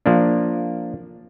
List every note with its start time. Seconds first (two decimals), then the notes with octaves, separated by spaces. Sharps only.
0.06 F3 A#3 D4